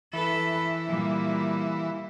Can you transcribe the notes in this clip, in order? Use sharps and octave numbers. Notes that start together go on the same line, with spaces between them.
E3 A4 B4
A#2 G3